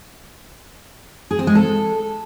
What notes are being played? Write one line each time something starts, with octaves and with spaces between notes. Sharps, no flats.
G#4
C4
G#3
A4